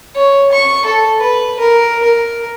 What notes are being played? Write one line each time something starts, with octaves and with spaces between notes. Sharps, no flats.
C#5
C#6
A4
B4
A#4
A#4